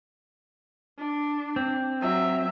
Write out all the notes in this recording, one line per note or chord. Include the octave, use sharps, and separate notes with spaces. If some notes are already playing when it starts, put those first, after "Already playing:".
D4
C4
F#3 E5